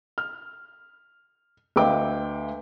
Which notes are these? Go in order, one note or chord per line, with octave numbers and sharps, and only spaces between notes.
F6
D2 B4 D#5 F5 G5 D6